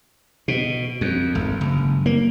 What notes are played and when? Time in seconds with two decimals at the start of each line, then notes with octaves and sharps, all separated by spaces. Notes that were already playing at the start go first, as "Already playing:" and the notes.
0.48 B2
1.01 F2
1.35 G#1
1.61 F#1
2.06 A#3